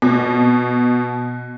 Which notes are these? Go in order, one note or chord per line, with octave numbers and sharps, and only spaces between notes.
B2